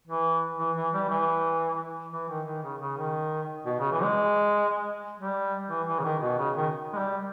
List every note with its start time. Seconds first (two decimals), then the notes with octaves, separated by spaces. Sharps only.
0.07 E3
0.59 E3
0.76 E3
0.93 G3
1.09 E3
2.12 E3
2.29 D#3
2.47 D#3
2.63 C#3
2.81 C#3
2.97 D#3
3.66 B2
3.79 C#3
3.92 E3
4.04 G#3
5.20 G3
5.70 E3
5.88 E3
6.00 C#3
6.04 D#3
6.22 B2
6.38 C#3
6.56 D#3
6.94 G#3
6.98 G3